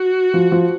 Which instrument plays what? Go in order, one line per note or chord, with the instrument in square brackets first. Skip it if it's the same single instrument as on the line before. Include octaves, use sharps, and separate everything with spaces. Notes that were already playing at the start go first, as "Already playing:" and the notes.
Already playing: [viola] F#4
[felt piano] F3
F3